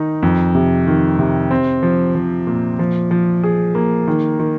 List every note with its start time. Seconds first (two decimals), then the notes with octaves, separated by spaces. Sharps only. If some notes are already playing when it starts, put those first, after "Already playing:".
Already playing: D#3 D#4
0.22 F2
0.55 C3
0.87 D#3
1.19 C3
1.51 C4
1.83 F3
2.15 F3
2.47 A#2
2.79 F3
3.11 F3
3.44 G#4
3.75 A#3
4.08 D#3
4.40 D#3